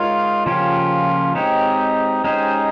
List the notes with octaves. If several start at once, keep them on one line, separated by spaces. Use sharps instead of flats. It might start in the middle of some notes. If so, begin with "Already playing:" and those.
Already playing: G#3 D#4 F4 A#4 C#5
C#3 F3 A#3 C#4 F4 G4
G#3 C4 D#4 G4 C#5
G#3 C#4 D#4 G4 C5